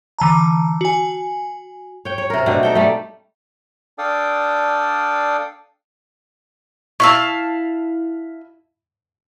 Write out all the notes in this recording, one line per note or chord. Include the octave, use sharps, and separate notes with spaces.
D3 E3 A5 A#5
F#4 G#5
C#5 G5
C#5
C3 A#4
B2 A3 C4 D4
D#4 A4 G5
G3 A3
D4 A4 D5 F5 G5 D#6
E4 F5 A5 C#6 E6